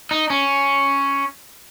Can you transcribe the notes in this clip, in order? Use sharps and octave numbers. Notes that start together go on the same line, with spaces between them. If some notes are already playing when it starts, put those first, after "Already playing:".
D#4
C#4